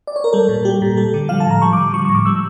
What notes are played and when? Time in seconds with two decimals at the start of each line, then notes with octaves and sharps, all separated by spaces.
0.07 D5
0.16 C#5
0.24 A#4
0.33 G3 A4
0.49 A#2
0.65 G3 G4
0.82 A#2
0.97 G3 A4
1.14 D3
1.29 F3 F5
1.40 A5
1.46 A2 A#5
1.62 G3 C#6
1.73 D3 D6
1.93 F3 C#6
2.05 A2 C#6
2.15 D6
2.26 G3 E6